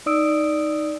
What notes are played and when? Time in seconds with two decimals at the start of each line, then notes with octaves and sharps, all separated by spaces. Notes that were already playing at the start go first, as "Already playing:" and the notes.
0.06 D#4 D5 D#6 E6 D7